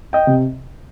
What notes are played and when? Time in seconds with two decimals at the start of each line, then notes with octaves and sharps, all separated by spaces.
0.13 D#5 G5
0.27 C3